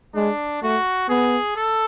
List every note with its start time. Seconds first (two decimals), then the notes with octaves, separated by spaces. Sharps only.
0.15 G#3 D4
0.62 A3 F#4
1.09 B3 G#4
1.56 A4